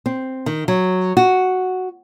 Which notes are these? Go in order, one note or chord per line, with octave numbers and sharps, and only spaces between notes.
C4
D#3
F#3
F#4